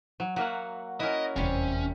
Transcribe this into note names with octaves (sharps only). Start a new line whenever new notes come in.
F#3
F#3 A#3 F#4 E5 F#5
C#4 E4 F#4 A#4 D#5
F1 E2 C3 G3 C#4